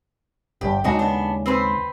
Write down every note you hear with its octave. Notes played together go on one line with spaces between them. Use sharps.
G1 G2 G4
D#2 C#3 G#3 D4 D#4 F#4
B3 D4
C4 B4 C5